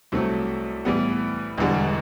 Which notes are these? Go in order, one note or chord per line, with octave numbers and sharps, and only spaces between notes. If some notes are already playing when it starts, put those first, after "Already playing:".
C2 C3 F#3 A3
A2 E3 G3 B3
E1 E2 D3 G3